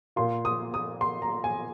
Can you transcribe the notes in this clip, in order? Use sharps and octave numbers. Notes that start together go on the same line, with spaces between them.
A#2 A#3 F4 C6
D#6
D#6
C6
A#5
G#5